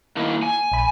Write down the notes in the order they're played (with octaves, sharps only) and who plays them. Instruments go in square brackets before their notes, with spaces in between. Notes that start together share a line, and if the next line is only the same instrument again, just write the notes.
[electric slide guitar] D#3 A#3 E4
G#5
[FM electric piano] A#1 B5